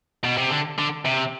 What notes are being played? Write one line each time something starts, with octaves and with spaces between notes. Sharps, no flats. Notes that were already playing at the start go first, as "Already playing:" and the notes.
B2
C3
D3
D3
C3